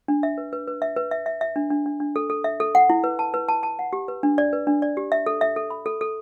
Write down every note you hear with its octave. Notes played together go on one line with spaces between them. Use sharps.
D4
E5
B4
B4
B4
E5
B4
E5
E5
E5
D4
D4
D4
D4
A4
A4
E5
A4
F#5
E4
B4
A5
B4
A5
A5
F#5
G4
B4
D4
D5
B4
D4
D5
G4
E5
A4
E5
A4
B5
A4
A4